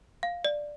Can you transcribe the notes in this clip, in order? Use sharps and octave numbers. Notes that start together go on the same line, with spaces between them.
F5
D5